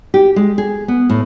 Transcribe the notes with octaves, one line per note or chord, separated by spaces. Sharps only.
G4
G#3
G#4
B3
A2